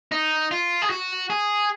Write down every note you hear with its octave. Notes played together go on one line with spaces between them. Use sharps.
D#4
F4
G#4
F#4
G#4